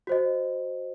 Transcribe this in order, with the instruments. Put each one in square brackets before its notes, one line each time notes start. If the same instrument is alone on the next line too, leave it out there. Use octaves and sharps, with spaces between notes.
[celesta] F#4 C5 D#5